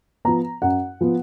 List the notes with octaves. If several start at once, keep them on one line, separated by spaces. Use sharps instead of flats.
F3 B3 A#5
F#2 F#5
F3 B3